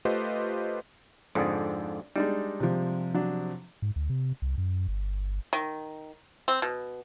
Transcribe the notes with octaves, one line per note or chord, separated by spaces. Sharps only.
A3 F4 G4 B4 C5 D#5
F2 G#2 D3 C4 D5 D#6
G3 G#3 D4 D#4
C3 F3
F#3 D4
G#2
D2
C3
C2
F#2
G1
D#3
C4
B2